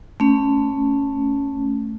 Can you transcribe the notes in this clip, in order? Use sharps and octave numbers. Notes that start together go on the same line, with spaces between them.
A3 C#4